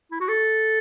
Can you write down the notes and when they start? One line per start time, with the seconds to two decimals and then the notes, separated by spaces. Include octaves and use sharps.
0.11 E4
0.20 F#4
0.28 A4